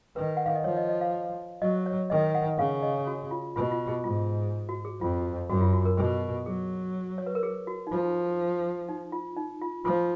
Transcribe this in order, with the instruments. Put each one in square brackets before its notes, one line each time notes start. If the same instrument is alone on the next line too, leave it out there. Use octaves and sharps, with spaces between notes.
[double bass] D#3 [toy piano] B4
[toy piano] F#5
F5
D#5
[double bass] F3 [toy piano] C#5
[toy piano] D#5
D#5
F5
[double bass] F#3 [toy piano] D#5
[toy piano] C#5
[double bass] D#3 [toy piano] D#5
[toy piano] F#5
[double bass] C#3 [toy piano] F5
[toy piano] D#5
F#4
F4
[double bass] B2 [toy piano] F4
[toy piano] F4
G#4
[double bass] G#2 [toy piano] F4
[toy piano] F#4
G#4
[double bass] F2 [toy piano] F4
[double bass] F#2 [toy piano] F#4
[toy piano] F4
F#4
A#4
[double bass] B2 [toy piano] G#4
[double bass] F#3 [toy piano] G#4
[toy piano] C#5
B4
A#4
G#4
F#4
D#4
[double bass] F3 [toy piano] F4
[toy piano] D#4
F4
D#4
F4
[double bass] F3 [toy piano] F4